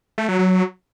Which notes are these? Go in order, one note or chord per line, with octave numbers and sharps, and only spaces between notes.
A3
F#3
F#3